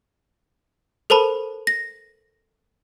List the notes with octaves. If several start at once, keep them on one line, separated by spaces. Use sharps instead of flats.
A4 A#4 C5 A5 B5
A#6